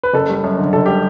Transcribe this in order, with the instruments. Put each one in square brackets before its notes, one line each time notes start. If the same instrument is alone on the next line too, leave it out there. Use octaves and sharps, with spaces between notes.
[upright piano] B4
F#1 A4
G3
F#2
D3
F#1 A4
G3 G4